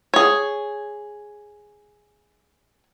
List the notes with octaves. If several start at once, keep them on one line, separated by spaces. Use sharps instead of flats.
G#4 C#5